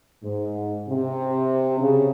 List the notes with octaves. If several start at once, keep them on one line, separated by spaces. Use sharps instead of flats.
G#2
C3
C#3